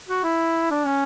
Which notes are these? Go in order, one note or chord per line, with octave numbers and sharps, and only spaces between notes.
F#4
E4
D4
C#4